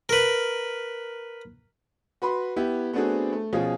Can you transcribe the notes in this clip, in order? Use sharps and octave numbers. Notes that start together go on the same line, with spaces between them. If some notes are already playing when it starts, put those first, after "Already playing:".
A#4 B4
F#4 B4 B5 C6
B3 E4 G4
A3 B3 C4 D4 F#4 G#4
A3
B2 F3 C#4 F4 G#4